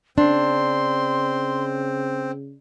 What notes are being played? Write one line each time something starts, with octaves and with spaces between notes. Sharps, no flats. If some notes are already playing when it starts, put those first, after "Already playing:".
C#3 C4 D4 C6